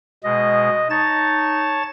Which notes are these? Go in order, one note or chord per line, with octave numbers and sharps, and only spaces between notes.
B2 G#3 D#5
D#4 C#5 A5 A6